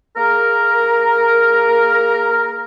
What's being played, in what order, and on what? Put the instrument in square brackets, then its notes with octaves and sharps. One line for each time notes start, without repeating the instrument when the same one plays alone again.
[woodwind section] A#3 G#4 A#4